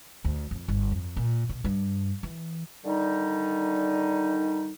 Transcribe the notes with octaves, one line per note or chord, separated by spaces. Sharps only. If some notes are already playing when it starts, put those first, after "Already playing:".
D2
F2
G1
F2
A#2
B2
G2
E3
D3 D#3 G3 D#4